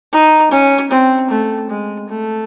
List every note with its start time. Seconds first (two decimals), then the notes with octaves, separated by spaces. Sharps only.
0.12 D#4
0.51 C#4
0.91 C4
1.30 A3
1.70 G#3
2.09 A3